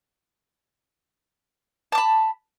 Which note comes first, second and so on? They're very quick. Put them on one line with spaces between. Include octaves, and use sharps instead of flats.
A5 D6 B5